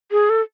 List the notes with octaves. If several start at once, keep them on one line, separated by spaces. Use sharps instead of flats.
G#4
A4